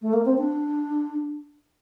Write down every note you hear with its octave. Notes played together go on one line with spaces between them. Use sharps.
A3
A#3
C4
D4